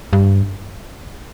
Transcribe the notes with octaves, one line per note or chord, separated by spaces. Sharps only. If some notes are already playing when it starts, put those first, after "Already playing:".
G2